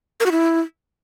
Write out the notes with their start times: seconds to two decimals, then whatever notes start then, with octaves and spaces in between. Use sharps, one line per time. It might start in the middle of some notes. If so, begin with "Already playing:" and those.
0.20 A#4
0.26 F#4
0.32 E4